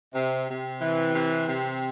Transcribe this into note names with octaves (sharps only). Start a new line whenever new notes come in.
C3
C3
E3
C3
C3